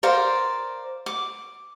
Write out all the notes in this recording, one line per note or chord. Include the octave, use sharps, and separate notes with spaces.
A#4 C5 D5 F5
D6